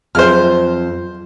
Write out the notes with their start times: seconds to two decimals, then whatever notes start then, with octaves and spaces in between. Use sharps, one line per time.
0.15 F2 F#3 G#4 C5 E5 F6